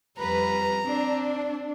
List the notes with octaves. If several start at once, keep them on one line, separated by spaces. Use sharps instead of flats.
F2 G3 B4 A#5
C4 D4